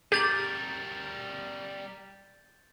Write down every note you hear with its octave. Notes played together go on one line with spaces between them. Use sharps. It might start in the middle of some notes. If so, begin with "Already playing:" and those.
G3 G4 A#4 G6 A6 F#7